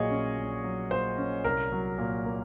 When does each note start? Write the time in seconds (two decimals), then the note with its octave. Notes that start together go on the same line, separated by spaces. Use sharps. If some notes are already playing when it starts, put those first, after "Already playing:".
Already playing: A#1 A#2 F#3 F#4 G#4 C#5 D#5
0.11 C#4
0.37 A#1
0.64 F#3
0.91 A#2 C5
1.18 C#4
1.44 C2 A#4
1.72 F#3
1.98 A#2
2.25 A#3